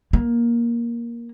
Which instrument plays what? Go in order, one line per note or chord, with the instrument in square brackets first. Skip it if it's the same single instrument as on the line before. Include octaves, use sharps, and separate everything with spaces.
[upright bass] A#3